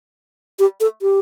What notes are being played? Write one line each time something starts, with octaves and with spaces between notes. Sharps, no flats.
G4
A4
G4